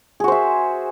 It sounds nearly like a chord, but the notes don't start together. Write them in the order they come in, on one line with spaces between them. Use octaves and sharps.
G#4 F#4 C5 E5